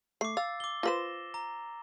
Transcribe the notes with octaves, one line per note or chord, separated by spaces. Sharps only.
A3 D6 C7
F5 E6 A6
D6 G7
F4 B4 C5 A#6 E7
A#5